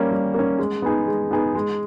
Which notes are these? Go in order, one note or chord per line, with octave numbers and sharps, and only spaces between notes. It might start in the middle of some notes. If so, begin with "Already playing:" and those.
Already playing: G3 A#3 C#4
G3
A#3 C#4
G#3
B3 D#4 G#4
G#3
B3 D#4 G#4
G#3